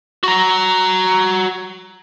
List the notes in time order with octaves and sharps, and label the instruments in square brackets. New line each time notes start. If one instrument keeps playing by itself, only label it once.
[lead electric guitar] F#4 A#5